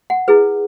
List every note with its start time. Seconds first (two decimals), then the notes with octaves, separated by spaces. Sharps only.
0.10 F#5
0.28 E4 G#4 B4